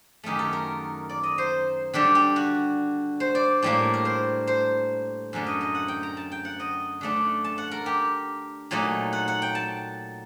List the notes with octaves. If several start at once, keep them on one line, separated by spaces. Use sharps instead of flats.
F#2 D#3 A3 D#4 G4
A4
A#4
D5
D#5
C5
D3 G3 D4 G4
G4
F#4
C5
D5
A2 G3 A#3 D4
A#4
C5
C5
F#2 D3 A3
D#5
D#5
F#5
G5
A#5
A5
G5
F#5
D#5
D3 A3 D4
A5
F#5
A#4
G4
A#2 F#3 A3 D#4
F#5
F#5
G5
A5